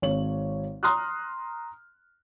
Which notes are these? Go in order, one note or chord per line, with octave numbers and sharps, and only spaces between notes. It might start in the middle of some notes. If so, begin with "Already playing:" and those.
G#1 C#5 F#7
A#5 C6 D#6 F6 F#6